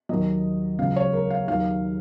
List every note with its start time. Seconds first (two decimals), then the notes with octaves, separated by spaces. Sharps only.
0.09 D#2 D#3 F#3 D#5
0.78 C#2 C#3 F#3 F5
0.96 C#5
1.13 A#4
1.30 F5
1.48 D#2 D#3 F#3 F5